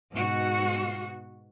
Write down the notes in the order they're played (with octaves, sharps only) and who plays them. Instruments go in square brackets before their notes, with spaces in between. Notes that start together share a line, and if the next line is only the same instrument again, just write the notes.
[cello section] G#2 B2 F#4